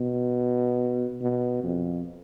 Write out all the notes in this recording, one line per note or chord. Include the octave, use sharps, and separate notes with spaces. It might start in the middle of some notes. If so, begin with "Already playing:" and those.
Already playing: B2
B2
F2